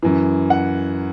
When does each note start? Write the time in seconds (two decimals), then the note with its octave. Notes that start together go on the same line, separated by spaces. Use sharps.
0.02 F#2 E3
0.50 F#5